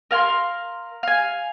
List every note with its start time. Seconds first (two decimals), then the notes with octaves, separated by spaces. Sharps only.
0.11 A#4 F5 G#5 C6
1.03 F5 G#5